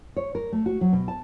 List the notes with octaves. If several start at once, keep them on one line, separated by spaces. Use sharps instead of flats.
C#5
A#4
A3
F#4
F#3
B2
A5